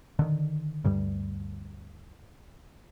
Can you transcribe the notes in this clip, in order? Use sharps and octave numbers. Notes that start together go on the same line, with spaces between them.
D3 D#3
D2 G2 G3